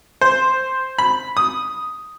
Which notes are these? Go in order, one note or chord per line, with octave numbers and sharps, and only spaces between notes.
C5
B5
D#6